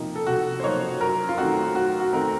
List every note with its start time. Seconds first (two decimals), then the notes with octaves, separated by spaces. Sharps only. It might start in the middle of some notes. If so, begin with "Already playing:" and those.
Already playing: C3 F3 A#3 D#4
0.16 A4
0.27 C3 F#4
0.60 C5
0.63 F3 A#3 D#4 C#5
1.01 F#2 A#4
1.29 F4
1.37 D#3 A3 C4 D#4 F#4
1.75 F#2 F#4
2.00 F#4
2.13 D#3 A3 C4 D#4 A#4